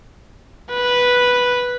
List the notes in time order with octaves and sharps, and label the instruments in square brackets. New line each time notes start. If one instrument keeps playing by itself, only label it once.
[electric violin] B4